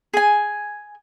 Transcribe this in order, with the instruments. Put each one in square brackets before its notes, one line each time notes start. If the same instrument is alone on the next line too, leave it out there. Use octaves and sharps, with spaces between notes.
[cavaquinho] G#4 G#5